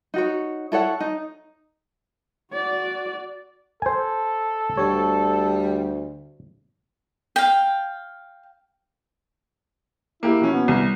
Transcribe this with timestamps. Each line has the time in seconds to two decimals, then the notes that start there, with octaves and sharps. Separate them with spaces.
0.14 D#4 F#4 C#5
0.72 E4 A4 C#5 F#5
1.00 D#4
2.53 F#4 D5
3.82 A4 C5 G#5
4.77 D2 G3 C#5
7.36 F5 G5
10.23 A#3 E4 G4
10.40 B2 F3 C#4
10.53 B3
10.68 C2